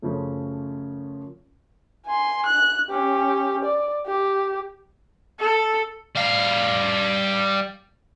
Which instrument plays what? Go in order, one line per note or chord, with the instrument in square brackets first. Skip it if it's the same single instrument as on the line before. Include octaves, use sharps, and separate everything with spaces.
[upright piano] F#2 C#3 F3 A3 C#4
[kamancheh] G#5 C6
F#6
C#4 G4
D5
G4
[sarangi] A4
[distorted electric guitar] G3 F5